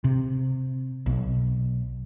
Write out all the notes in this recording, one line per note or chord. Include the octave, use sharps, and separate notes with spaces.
C3
B1